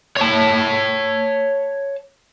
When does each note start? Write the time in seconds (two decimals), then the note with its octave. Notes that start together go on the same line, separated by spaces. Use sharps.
0.17 C#5 A5